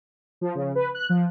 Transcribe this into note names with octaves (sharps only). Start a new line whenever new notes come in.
F3
C#3
B4
F#6
F3